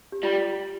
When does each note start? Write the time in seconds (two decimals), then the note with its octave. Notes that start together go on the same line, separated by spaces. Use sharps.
0.12 G4
0.23 G3 F4